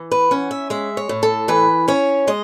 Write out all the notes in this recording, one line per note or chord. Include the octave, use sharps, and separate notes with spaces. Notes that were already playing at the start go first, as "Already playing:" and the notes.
Already playing: E3
B4
C#4 F#5
E5
G#3 E5
C#5
A2
A4
E3 B4
C#4 C#5
G#3 D#5